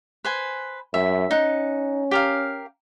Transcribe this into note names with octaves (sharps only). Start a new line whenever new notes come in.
B4 C5 G#5
F#2 E5
C#4 D#4 F#5
G4 A#4 F5